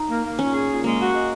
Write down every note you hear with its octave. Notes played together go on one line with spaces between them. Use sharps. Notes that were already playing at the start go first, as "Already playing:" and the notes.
Already playing: D#4
A#3
A#3
A#2 C#4
G#4
A#2
G#3 A#3
F#4
G#3